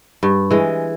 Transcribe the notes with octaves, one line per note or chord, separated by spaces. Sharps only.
G2
E3 G#3